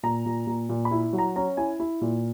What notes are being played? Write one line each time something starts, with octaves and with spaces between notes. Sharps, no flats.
A#2 A#5
A#2
A#2
A#2
B5
E4
F#3
A#5
C#4 A#5
E4 G#5
E4
A#2